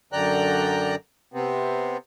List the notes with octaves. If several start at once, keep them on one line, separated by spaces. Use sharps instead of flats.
F#2 D3 D5 G5 A#5 F#6
C3 B3 C4